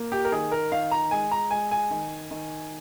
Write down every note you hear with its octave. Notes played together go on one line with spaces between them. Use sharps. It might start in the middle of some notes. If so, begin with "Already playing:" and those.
Already playing: A#3
G4
A#4
D#3 G#4
A#4
D#3 F5
A#5
G#3 G#5
A#5
G#3 G#5
G#5
D#3
D#3